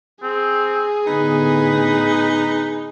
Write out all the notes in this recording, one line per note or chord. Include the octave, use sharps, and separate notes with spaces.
C4 G#4
A2 D3 B3 D#4 B4